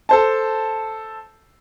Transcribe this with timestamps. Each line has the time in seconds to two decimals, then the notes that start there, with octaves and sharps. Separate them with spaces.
0.09 A4 C5 A5